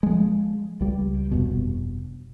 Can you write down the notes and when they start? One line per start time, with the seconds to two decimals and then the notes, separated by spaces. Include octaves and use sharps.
0.03 F3 G#3
0.81 C#2 G3
1.31 F1 G2 B2